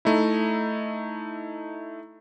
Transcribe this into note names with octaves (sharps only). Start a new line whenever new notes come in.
A3 D#4 E4